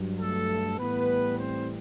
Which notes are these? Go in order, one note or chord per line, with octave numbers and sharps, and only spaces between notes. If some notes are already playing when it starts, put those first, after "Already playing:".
Already playing: G2 F#3
A3 A4
A2 E3 G3 B3 B4
C4 C5